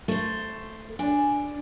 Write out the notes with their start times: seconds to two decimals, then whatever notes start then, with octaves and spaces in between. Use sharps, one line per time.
0.08 A3 C5
0.99 D4 D5 G#5